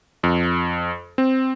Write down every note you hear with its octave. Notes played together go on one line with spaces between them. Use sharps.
F2
C4